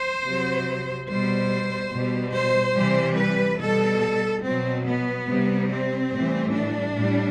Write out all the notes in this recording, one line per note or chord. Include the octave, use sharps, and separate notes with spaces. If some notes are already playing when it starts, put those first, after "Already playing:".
Already playing: C5
C3 F#3
B2 G3 C5
B2 G3
C5
C3 E3 G3
B4
B2 G3 A4
B2 F#3 C4
B3
C3 G3
C4
A2 E3 G3
D4
A2 G3